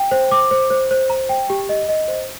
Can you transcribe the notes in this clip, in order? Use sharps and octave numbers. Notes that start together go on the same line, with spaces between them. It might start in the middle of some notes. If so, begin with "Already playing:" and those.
Already playing: G5
C5
D6
C5
C5
C5
A#5
G5
G4
D#5
D#5
C5